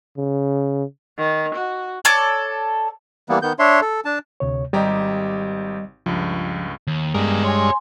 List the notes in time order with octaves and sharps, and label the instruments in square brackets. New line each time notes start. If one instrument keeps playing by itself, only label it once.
[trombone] C#3
[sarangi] D#3
F#4
[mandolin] A4 C#5 D5
[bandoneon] E3 G3 A#3 B3
D#3 B3 G6
D4 C#5 E5 C6
A4
D4 A5
[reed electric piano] D2 C3 C#5
[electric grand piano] G#1 G4 A#5 [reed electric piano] G3 D#5
[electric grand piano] C#2 G2 [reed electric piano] F3
[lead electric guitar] D#2
[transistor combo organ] G2 G#3 [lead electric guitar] B3 A#4
[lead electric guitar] C#5 [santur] G#5 C6